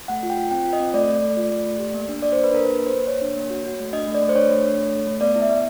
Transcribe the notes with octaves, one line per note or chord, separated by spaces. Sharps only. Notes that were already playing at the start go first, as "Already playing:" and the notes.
A3 F#5
F4
G5
F4
C4 G5
F4
D#5
C4
A3 D5
A3
A3
F4
A3
A3
G4
A#3
D4
A#3 D5
A#3 C5
B4
D4 A#4
A#3 B4
A#3
C5
A#3
A#3 C#5
D4
A#3
F#4
F#4
A3
D4 D#5
A3
D5
A3
C5
D4 C#5
A3
D4
A3
A3
A3
B3 D5
E4
E5
B3